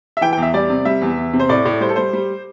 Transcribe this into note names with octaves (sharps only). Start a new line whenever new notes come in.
E5
E3 G5
G5
E2 E5
G3 D5
C3
G3 E5
E2
E2
C3
C5
A2 D5
A2
G3 C5
A4
G3 C5
G3